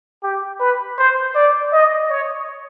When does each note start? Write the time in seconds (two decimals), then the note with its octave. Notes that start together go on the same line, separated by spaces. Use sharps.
0.23 G4
0.60 B4
0.98 C5
1.35 D5
1.73 D#5
2.10 C#5